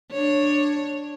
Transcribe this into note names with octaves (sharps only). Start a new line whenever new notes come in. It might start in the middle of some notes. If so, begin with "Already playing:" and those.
D4 C#5